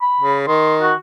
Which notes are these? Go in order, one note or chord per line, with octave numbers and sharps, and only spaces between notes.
B5
C#3
D#3 C6
F#4